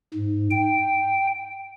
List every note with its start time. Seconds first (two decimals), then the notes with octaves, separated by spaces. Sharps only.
0.14 G#2
0.50 G5